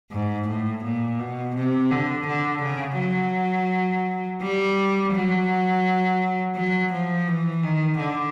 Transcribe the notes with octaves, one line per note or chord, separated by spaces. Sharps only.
G#2
A2
A#2
B2
C3
D3
D3
C#3
F#3
G3
F#3
F#3
F3
E3
D#3
D3